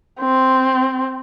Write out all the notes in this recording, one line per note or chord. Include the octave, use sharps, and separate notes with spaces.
C4